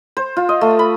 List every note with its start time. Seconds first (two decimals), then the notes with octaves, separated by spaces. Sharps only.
0.17 C5
0.36 F4
0.49 D#5
0.61 A3
0.79 B5